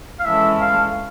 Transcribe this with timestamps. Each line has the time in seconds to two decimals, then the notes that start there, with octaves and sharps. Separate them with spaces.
0.19 F5
0.25 E3 G#3 C#4 E4 A4 E5
0.61 F5